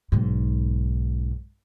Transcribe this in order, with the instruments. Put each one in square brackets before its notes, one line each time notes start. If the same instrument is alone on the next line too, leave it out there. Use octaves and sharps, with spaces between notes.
[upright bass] B1 G#2